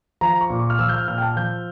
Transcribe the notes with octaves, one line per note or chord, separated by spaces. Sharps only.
F3 A#5
C#6
A#2
C#6
F6
F3 E6
G6
F6
A#2 F6
G5
A5
F3 G6